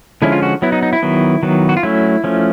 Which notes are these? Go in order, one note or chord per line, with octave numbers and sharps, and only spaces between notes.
D3 F3 G#3 C#4 E4
F4
F#4
F#3 B3 E4
D#4
D#4
E4
D#3 F#3 B3
D#3 F#3 B3
F#4
F4
F#3 A3 C#4 E4
F3 A3 C#4